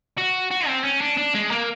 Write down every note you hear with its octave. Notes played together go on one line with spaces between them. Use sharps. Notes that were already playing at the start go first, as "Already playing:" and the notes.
F#4
F#4
C4
C#4
D4
D4
G#3
A#3